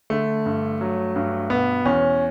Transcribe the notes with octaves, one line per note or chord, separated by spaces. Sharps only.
D3 A3
G2
F#3
G2
B2 B3
E2 C#4